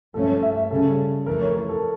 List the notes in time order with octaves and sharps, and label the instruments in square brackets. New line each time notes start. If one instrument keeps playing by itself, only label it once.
[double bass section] G2 F3 A3 C#4 [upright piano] A4
[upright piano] C#5
E5
E5
[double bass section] C#3 G3 C#4 [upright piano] A4
[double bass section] F2 E3 A3 [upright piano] A#4
[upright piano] C#5
A#4
A4